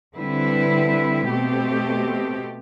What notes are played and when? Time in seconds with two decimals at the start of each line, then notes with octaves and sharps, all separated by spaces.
0.17 D3 G3 C4 E4 B4
1.29 B2 A3 C4 G4